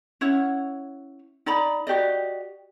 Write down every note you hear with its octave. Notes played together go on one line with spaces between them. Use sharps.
C#4 E4 C#5 F#5
D#4 D5 A#5 B5
F#4 G4 D5 D#5